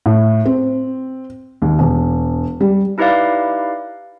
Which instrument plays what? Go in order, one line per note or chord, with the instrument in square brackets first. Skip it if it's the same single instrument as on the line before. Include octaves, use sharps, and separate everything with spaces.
[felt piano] A2
C4
D#2
E1
G3
[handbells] D#4 E4 G4 B4 D5 F5